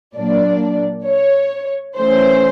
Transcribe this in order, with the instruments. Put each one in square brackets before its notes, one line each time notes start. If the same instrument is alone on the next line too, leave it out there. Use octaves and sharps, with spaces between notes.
[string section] A#2 F#3 A#3 D4 D5
C#5
E3 A3 C#4 C5